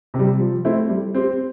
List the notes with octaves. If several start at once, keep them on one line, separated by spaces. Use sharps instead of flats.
C3
G3
F3
A3 C4 E4
G3
C4 G4 C5